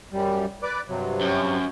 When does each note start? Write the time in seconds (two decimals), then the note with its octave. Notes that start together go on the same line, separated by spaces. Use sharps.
0.13 F#2 G3
0.63 B4 D5 D6
0.89 G2 C3 F#3
1.21 F#2